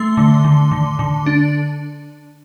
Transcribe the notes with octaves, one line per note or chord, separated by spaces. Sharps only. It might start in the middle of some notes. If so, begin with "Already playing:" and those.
Already playing: A3 C6
D3
D3
D3
D3
D4